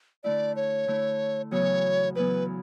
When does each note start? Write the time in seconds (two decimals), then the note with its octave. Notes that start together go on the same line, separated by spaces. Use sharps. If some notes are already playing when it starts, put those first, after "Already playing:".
0.24 D3 A3 E4 D5
0.56 C#5
0.87 D3 A3 E4
1.51 E2 C#3 F#3 B3 C#5
2.15 E2 C#3 F#3 B3 B4